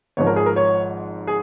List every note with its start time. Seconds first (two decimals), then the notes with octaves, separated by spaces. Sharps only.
0.17 G#1 G#2 F3 C#5
0.27 A#4
0.36 G#4
0.46 A#4
0.56 C#5
1.27 G#4